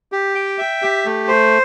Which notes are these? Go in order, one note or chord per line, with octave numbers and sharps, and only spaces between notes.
G4
G5
E5
G4
A3
C5